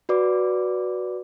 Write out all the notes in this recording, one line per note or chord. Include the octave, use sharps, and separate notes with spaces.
F#4 B4 D5 D6